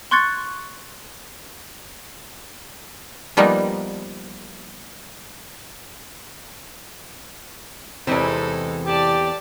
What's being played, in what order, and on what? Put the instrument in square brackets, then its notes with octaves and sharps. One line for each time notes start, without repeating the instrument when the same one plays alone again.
[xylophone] C6 C#6 F#6 G#6 A6 C#7
[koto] F3 G3 A#3 B3 D#4
[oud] E2 C4 [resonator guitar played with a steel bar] C3 E3 G#3 [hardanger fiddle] D#4 A4
[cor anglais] G4 [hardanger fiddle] D5 A5